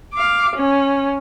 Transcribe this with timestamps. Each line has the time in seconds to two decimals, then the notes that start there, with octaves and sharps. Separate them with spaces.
0.14 F5 D6
0.55 C#4